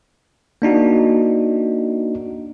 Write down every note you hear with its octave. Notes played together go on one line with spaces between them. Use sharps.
A#3 D4 D#4 F#4